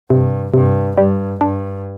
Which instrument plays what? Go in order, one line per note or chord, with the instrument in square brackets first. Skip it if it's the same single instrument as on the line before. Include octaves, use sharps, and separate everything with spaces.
[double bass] G2 [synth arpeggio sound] C3
[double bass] G2 [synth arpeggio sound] C3
[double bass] G2 [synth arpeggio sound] G3
[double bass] G2 [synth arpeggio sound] D4